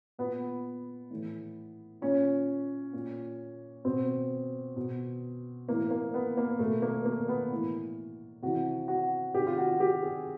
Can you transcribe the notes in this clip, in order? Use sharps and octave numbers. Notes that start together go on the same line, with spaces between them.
A#2 B3
A2 E3
A#2 C#4
A#2
B2 C4
B2
A2 E3 A#3
A#3
B3
A#3
B2 A3
A#3
A#3
B3
A2 E3
C3 E3 F#4
F#4
C3 D#3 G4
F4
F#4
G4
G#4